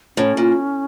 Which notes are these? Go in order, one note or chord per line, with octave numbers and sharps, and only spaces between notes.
A2 C#4
A#2